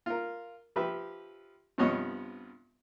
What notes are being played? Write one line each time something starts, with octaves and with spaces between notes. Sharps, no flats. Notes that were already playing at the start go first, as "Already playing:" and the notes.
F4 A#4
F3 G4 B4 E5
G2 C3 F3 B3 C#5 D#5